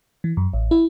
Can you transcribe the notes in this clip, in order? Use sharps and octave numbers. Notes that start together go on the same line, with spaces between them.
E3
F#2
A1
E4